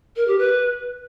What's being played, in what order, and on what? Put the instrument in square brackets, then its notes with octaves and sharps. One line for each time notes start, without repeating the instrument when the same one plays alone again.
[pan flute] A#4
G4
B4